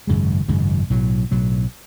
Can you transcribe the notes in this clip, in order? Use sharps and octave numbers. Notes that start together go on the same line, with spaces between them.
G#1 F#2 C#3 G#3
G#1 F#2 C#3 G#3
B1 A2 F#3
B1 A2 F#3